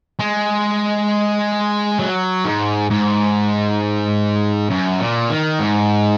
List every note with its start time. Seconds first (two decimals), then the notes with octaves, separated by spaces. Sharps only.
0.19 G#3
1.99 F#3
2.45 G#2
2.90 G#2
4.70 F#2
4.99 A#2
5.30 D#3
5.59 G#2